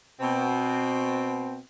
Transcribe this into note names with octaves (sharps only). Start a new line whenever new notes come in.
B2 C4